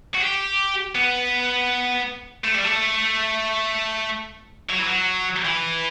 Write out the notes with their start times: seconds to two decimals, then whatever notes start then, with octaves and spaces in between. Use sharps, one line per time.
0.15 F#4
0.21 G4
0.95 B3
2.44 A3
2.55 G3
2.64 A3
4.70 F#3
4.79 E3
4.87 F#3
5.45 E3